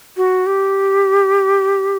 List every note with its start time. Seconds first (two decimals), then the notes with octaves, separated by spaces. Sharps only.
0.17 F#4
0.46 G4